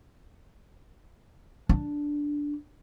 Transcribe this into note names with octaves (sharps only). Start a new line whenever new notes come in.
D4